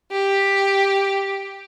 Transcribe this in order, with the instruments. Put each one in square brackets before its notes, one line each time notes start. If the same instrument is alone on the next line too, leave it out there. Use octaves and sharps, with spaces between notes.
[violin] G4